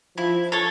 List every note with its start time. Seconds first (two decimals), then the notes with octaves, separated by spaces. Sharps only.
0.18 F3 E4
0.52 A4 C#5